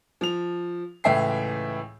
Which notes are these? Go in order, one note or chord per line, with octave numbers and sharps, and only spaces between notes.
F3 F7
C#2 A2 E3 E5 G5 C7